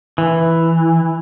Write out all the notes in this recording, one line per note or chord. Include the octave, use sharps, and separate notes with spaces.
E3